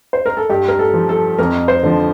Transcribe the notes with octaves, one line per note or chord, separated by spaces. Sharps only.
C5
A#4
A4
G2 G4
A#4
A4
F3
A4
F2 A#4
C5
D3 F3